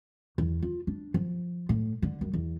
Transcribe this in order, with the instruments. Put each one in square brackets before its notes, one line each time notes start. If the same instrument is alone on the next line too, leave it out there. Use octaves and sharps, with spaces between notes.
[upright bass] E2
F4
D4
F3
A2
D3
F#2
E2